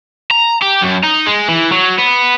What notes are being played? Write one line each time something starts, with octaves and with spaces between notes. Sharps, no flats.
A#5
G4
F#2
D#4
G#3
E3
F#3
B3